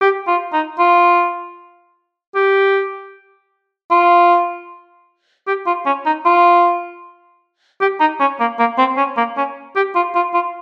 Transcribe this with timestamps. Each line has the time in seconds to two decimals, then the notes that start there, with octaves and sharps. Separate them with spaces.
0.01 G4
0.27 F4
0.53 D#4
0.79 F4
2.35 G4
3.91 F4
5.47 G4
5.66 F4
5.86 C#4
6.06 D#4
6.25 F4
7.81 G4
8.00 D#4
8.20 C#4
8.40 A#3
8.59 A#3
8.78 C4
8.97 C#4
9.17 A#3
9.37 C#4
9.76 G4
9.95 F4
10.15 F4
10.34 F4